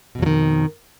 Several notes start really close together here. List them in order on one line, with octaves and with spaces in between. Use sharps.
B2 F2 F#3 D#3